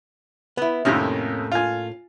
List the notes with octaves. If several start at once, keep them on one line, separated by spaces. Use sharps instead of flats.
B3 E4
F2 A2 C3 D#3 A#3 C#4
F4 G#5